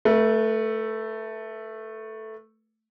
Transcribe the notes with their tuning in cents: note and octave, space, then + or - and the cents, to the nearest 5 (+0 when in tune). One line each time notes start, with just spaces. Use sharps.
A3 +0 B4 -35